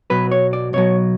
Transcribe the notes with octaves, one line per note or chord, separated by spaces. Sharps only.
B1 B2 F#3 B4
C#5
D5
B1 B2 F#3 C#5